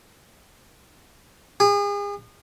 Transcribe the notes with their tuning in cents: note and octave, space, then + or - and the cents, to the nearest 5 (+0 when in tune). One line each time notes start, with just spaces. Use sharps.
G#4 -40